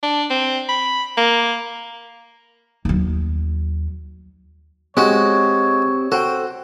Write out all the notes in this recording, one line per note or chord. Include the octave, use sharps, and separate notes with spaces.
D4
C4
B5
A#3
D#2 F#3
G#3 C4 F#4 G4 C#5
F#4 A4 C5 G5